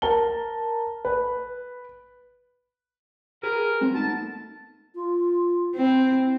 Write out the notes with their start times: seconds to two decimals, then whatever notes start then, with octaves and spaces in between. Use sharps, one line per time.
0.02 A#4 A5 G7
1.05 B4
3.43 G4 G#4 A#4 B4
3.81 G#3 C4 F#4
3.95 A3 B3 D#4 A5
4.95 F4
5.75 C4 E4